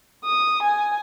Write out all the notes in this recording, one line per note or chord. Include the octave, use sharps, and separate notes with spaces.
D#6
G#5